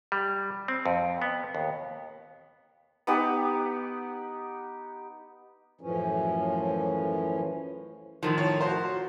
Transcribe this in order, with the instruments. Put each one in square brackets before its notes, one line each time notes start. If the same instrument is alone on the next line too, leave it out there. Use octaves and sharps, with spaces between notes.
[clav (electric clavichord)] G3
C4
F2
B3
D#2
[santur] B3 D#4 G4 F#5
[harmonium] F#2 A2 E3 F3 C#4
[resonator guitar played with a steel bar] A2 D#3 F3
[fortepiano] C#5
F#4 C5